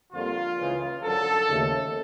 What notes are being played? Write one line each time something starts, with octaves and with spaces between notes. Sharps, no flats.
F2 D3 G3 A#3 F4
C#2 C#3 E3
F#2 D3 F3 A4
D#2 C#3 F3 A3